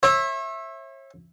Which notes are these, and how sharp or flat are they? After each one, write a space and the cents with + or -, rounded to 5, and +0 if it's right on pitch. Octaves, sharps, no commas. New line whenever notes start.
C#5 -40 E5 +0